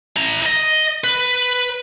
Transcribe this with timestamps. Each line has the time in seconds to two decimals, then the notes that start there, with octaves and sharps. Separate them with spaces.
0.17 E4 A#5
0.46 D#5
1.04 B4